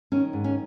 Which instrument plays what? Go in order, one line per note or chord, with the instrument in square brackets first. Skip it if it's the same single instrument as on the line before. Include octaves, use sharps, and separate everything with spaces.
[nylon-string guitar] D#3 C#4
G#2
C#4